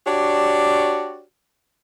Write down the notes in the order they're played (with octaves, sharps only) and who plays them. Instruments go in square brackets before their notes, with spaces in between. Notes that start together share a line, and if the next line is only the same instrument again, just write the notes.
[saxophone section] D4 F#4 G4 C#5 D5